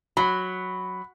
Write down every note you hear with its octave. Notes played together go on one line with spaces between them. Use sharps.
F#3 B5